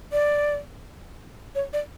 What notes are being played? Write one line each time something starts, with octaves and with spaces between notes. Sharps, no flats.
D5
C#5
D5